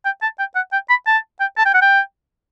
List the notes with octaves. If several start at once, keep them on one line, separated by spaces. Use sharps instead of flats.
G5
A5
G5
F#5
G5
B5
A5
G5
A5
G5
F#5
G5